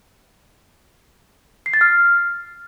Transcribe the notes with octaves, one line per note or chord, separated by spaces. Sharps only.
C7
A6
F6